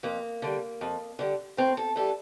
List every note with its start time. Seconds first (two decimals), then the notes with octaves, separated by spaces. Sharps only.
0.03 F2 A#3
0.42 D3 G3
0.81 F2
1.19 D3 G3
1.57 A2 C4
1.77 A4
1.96 E3 G3 A4